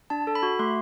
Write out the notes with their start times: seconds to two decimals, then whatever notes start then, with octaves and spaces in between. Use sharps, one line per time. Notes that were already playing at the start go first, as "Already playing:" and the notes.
0.10 D4 A5
0.27 A4
0.35 B5
0.43 F#4
0.59 A3 C6